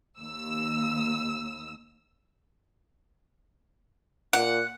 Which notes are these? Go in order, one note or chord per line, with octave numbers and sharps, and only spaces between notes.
D#2 E6
A#2 F#5